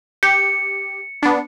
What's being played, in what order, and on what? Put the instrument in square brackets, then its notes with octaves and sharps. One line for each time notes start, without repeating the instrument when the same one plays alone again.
[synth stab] G4 [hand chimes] C#7
[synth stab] B3 D4